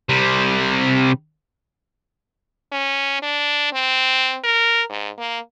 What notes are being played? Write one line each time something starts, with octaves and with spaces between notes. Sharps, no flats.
C3 G3
C#4
D4
C4
A#4
G#2
A#3